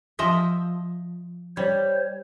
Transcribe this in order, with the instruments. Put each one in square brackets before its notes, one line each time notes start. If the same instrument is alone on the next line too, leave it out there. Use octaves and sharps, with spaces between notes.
[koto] F3 D#5 E5
[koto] G3 [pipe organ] C5 C#5